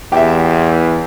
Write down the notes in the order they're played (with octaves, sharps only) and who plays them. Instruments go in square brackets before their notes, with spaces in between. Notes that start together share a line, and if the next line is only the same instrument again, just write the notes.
[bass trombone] E2 [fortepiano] G4 E5